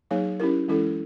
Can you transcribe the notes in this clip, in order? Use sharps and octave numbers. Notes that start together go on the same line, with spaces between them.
F#3 A#3 D#4 G#4 C#5
C#4 E4 G4 A#4
E3 G#3 C#4 E4 A4